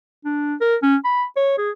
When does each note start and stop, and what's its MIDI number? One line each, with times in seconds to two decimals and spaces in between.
0.25 0.54 62
0.61 0.76 70
0.82 0.96 61
1.04 1.24 83
1.36 1.56 73
1.58 1.71 68